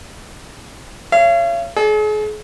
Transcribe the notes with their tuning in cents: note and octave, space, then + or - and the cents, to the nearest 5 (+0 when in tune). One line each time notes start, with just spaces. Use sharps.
C#5 +0 F5 -45
G#4 +40 D5 +0